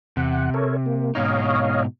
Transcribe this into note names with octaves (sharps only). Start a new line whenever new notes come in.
E2 C3 F#5
A4 A#4 C#5
A#3
G#2 B2 D#4 C#5 D#5 F5